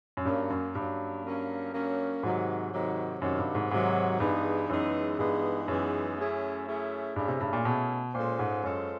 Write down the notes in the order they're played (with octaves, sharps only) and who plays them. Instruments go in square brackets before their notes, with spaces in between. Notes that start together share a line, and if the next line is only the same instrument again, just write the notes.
[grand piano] F#2
[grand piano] G2 [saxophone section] F#3 A#3 C#4
[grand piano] F#2
[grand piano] G2 [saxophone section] F#3 A#3 C#4
[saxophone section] F#3 A#3 C#4
F#3 A#3 C#4
[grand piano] G#2 [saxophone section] C3 D#3 F#3
[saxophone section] C3 D#3 F#3
[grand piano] F#2 [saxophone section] C3 D#3 F#3
[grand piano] G2
G#2
[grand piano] G#2 [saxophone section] C3 D#3 F#3
[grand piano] G2 [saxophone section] E3 G#3 B3 D#4 G#4
[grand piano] F#2 [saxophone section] E3 G#3 B3 D#4 G#4
[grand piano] G2 [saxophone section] E3 G#3 B3 D#4 G#4
[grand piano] F#2 [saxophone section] E3 G#3 B3 D#4 G#4
[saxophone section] A3 C#4 E4 G#4
A3 C#4 E4 G#4
[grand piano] G2 [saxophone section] A3 C#4 E4 G#4
[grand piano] C3
G2
A#2
[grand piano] B2 [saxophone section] A3 C#4 E4 G#4
[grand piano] A#2 [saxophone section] G#3 C#4 F4 A4 C5
[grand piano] G#2
[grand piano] F#2 [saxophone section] G#3 C#4 F4 A4 C5